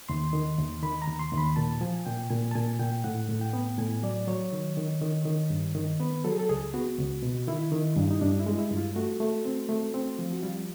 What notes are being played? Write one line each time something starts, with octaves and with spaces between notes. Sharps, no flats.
D#2 C6
D#3
D#2
D#3 B5
A#5
D#2
C6
D#2
B5
A#2 A5
F3 G#5
A#2 G5
A#2 G#5
A5
A#2 G#5
A#2 G5
A2 F#5
A2
G5
B3
A2 G#5
F#3 D5
F#3 C#5
D#3
D#3
D#3
D#3
G2
D#3
B3 B4
F#3 A4
G#4
A4
C#2 G#4
B3 F#4
C#2
B2
D#3 E4
D#3
G2
D#4
G2 D4
E4
G#3
E4
G2
F4
A3 F#4
A3
C4
A3
C4
F3
F#4
G3 F4